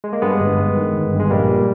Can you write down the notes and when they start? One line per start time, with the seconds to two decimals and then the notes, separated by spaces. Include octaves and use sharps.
0.04 G#3
0.13 A#3
0.22 G2 G#3 B3
0.40 G1
0.58 G2
0.76 D#3
0.94 G1
1.13 G2
1.19 G#3
1.30 A#1 G3 A#3
1.48 A#2